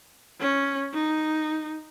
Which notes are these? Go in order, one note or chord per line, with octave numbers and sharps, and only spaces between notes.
C#4
D#4